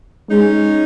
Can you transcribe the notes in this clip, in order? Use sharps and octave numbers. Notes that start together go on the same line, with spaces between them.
G#3 C#4 D#4